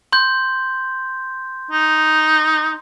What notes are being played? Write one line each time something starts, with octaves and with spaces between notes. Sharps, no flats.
C6 G6
D#4